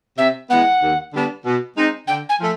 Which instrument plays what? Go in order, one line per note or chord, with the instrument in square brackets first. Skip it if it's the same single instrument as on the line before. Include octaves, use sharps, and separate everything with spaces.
[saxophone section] C3 [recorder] E5
[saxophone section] E3 G#3 B3 [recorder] F#5
[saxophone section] D#2
D3 G3 B3 D4
B2
G#3 C4 D#4
[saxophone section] D3 [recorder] G5
[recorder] G#5
[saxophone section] F3 A3